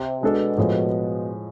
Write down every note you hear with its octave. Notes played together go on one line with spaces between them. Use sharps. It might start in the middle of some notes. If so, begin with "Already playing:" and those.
Already playing: C3
B2 G#3 D4 A4
A2 F3 G#3